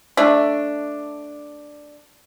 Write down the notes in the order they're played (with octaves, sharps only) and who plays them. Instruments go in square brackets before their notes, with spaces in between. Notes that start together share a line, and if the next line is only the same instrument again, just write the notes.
[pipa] A3 D4